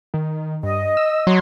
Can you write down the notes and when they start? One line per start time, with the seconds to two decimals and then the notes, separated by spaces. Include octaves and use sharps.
0.14 D#3
0.63 G2 D#5
0.97 E6
1.27 F#3 C6